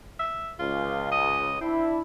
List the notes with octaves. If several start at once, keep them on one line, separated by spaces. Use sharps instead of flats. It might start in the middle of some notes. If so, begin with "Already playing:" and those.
E5
C#2 F4
D#5
C4 D4 E4